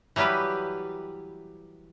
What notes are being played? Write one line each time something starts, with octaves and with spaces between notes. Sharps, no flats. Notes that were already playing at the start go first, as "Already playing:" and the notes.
E3 F#3 G3 G4 B4